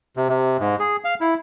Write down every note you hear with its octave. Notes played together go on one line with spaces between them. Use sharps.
C3
C3
G#2
G#4
F5
E4